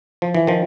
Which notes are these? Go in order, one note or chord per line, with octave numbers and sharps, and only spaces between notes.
F3
E3
D#3 F3